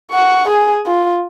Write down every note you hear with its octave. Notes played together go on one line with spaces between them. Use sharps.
F#5 C#6
G#4 G#5
F4